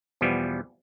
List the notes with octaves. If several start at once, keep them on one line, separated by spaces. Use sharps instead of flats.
E2 B2 F3 G3 B3